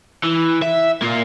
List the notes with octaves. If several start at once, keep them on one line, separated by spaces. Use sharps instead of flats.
E3
E5
A#3 F4